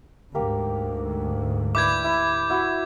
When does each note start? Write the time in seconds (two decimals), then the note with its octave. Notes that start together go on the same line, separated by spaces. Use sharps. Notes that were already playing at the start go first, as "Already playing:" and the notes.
0.35 D2 G#2 A#3 G4 A#4
1.75 E4 B4 D5 D6 G6 G#6
2.04 E4
2.50 E4 F#4 E5